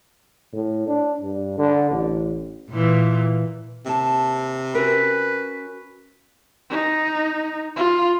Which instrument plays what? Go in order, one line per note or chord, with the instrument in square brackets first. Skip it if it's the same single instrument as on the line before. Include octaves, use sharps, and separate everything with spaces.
[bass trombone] A2
D4
G2
D3
A1
[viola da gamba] A#2 E3
[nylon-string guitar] D#2 A5 [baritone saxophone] C3
[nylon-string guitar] C#4 F#4 A#4 [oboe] B4
[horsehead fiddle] D#4
F4